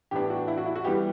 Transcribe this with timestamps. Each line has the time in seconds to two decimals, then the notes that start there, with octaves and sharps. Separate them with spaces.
0.11 A2 E3 B3 D4 G4
0.30 F#4
0.48 E4
0.57 F#4
0.66 E4
0.75 F#4
0.85 E3 G3 B3 G4